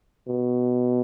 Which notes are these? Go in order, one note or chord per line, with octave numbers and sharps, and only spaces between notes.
B2